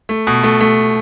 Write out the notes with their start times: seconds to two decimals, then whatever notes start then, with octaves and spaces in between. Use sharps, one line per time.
0.09 A3
0.27 B2
0.44 A3
0.60 A3